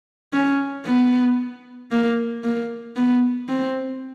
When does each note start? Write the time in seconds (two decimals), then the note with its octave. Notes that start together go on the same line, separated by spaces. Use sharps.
0.34 C#4
0.86 B3
1.91 A#3
2.44 A#3
2.96 B3
3.49 C4